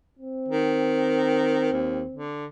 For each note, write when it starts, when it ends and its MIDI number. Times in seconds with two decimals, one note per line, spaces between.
0.19 2.29 60
0.48 1.70 51
1.72 2.03 39
2.11 2.46 50